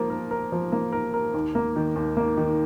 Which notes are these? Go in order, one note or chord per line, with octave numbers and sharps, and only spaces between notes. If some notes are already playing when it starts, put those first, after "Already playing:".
Already playing: F3 A#3 A#4
A#4
A#4
F3
A#3
A#4
A#4
D#2
A#3
D#3
D#2
A#3
D#3